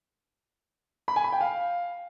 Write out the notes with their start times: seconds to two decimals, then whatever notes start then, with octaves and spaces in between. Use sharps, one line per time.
1.08 B5
1.16 G#5
1.24 B5
1.32 G5
1.41 F5